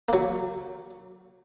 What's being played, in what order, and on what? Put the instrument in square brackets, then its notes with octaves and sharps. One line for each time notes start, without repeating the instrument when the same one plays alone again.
[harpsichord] F#3 A#3